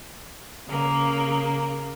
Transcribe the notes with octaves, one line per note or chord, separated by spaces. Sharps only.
C#3 A#3